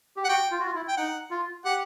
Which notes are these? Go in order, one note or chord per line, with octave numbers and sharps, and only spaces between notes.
G4
F#5
F#4 G5
F4
F#4
F4
E4
G5
D#4 F#5
F4
G4 F#5